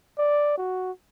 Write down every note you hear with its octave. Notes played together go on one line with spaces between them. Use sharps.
D5
F#4